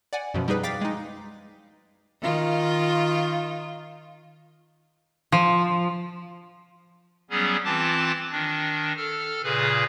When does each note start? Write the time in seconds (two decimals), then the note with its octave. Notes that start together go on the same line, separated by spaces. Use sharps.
0.13 D5 F#5 G#5
0.34 F#2 B2 F3
0.48 G3 D#4 G#4 B4
0.63 F5 G5 D6 A6 B6
0.81 G#3 D#4
2.22 D#3 F4
5.32 F3
7.30 F#3 G3 B3 C#4 G#4
7.65 E3 C4 F4 A5 D6 A6
8.31 D#3 D4
8.97 A4 F6
9.43 A#2 C#3 G#4 B4